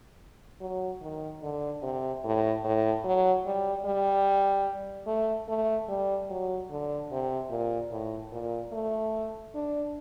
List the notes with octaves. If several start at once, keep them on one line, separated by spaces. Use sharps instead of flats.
F#3
D#3
D3
C3
A2
A2
F#3
G3
G3
A3
A3
G3
F#3
D3
C3
A#2
A2
A#2
A3
D4